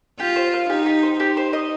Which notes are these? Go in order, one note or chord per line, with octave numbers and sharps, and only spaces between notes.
F4 G4
C5
F5
D#4 G4
G4
C5
D#4 G4
C5
D#5